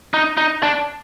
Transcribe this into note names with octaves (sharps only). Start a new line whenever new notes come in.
D#4
D#4
D4